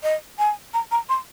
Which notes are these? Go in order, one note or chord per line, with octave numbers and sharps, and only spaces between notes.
D#5
G#5
A#5
A#5
C6